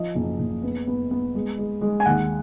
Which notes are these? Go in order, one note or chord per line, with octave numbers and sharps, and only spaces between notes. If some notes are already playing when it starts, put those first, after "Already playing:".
Already playing: F3 D#5
F#1
F#1
B3
B3
B3
G#3
G#3
G#3
G#5
D#2 F#5